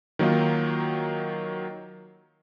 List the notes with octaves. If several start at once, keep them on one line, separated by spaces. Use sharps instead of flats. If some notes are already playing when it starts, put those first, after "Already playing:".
D#3 F#3 A#3 D#4 F4